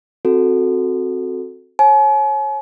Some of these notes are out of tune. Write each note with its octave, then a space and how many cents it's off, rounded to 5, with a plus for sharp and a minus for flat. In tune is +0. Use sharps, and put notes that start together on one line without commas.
C4 +0 F#4 +0 A4 +5
C#5 -30 G#5 +45